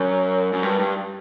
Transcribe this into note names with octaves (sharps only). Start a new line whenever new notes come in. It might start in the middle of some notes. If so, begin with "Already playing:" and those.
Already playing: F#2
F#2
G2
G2